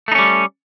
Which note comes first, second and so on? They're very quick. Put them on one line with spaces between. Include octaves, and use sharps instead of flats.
A3 D#4 C#4 G3